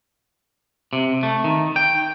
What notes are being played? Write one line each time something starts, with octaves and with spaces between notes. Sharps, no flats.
C3
A3
D#3
G5